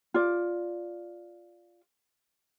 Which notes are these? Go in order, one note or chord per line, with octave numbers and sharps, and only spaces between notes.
F4 D5